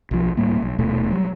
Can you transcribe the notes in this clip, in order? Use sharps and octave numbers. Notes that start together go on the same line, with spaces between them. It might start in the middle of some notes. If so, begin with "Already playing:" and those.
B1 F3
D1 A2 G3 A#3
B1
D#1 B2 A3
F#3 G3